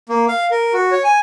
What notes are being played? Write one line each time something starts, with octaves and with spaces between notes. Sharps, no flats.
A#3
F5
A#4
F#4
C#5
G#5